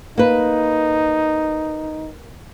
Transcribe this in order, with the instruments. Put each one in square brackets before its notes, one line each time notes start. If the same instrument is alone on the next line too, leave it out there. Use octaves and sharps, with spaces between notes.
[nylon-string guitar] A#3 B4 [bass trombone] D#4